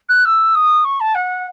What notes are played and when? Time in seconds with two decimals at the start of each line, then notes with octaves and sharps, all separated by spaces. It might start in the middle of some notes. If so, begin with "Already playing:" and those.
0.08 F#6
0.25 E6
0.54 D#6
0.84 C#6
1.00 A5
1.14 F#5